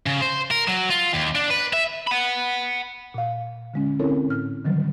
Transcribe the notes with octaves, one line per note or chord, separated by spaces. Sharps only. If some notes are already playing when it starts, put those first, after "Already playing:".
C#3
C5
A#4
F#3
F4
D#2
D4
B4
E5
F#5 B5
A#2 F5
D3 G#3 C#4
C4 C#4 E4 A4 A#4 C#5
A2 F6
D3 D#3 F#3 G3